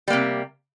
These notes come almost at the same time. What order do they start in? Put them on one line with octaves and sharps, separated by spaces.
G3 A#3 C3